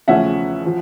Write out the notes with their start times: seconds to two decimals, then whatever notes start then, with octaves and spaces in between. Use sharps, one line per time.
0.08 E2 C#3 F3 A3 C#4 E5 F#5
0.66 F3